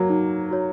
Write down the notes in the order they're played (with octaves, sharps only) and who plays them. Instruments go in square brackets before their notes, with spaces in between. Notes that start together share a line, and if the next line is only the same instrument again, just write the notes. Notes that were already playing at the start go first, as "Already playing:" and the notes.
Already playing: [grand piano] F#3 A#3 [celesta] F#4 C#5
[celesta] D#4
F#4 C#5